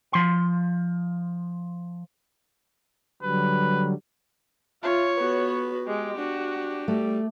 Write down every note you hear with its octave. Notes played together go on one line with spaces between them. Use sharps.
F3 C6
D3 F#3 G3 B4
F4 C#5 E5
B3 F#4 B4
G#3 G4
D4 F#4
G3 A3